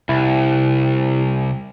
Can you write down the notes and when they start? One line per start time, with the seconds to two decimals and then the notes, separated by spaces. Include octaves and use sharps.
0.09 C2 E4